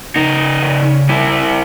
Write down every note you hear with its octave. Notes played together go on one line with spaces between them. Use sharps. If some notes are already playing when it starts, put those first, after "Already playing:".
C#3 D#4
C#3
G3 E4